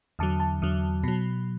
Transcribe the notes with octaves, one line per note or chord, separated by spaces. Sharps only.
E2 D3 F#3 A5
A5
E2 D3 F#3
B2 F#3